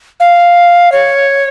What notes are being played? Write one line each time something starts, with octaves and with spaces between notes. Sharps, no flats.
F5
C#5